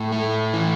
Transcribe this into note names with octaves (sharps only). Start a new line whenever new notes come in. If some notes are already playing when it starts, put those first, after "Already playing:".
Already playing: A2
A3
E3